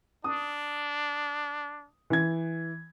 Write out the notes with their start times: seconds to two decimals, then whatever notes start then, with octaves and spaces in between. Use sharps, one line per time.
0.24 D4 D#6
2.10 E3 G#6